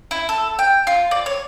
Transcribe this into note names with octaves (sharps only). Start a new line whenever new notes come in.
E4
A4
G5
F4
D5
C#5